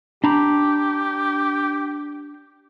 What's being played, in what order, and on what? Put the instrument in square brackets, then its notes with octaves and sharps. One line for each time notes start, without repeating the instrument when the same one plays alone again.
[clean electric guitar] D4 A#5 B5 [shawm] G4